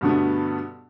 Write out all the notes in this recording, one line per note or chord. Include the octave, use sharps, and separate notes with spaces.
G2 B2 D3 A3 B3